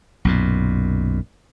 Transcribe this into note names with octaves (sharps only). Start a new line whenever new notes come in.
B1 F#2 A#2